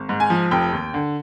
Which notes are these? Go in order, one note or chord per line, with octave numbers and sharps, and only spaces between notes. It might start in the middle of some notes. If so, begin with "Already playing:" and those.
Already playing: G#1
G#2
G#5
F3
F1 G5
D#2
D3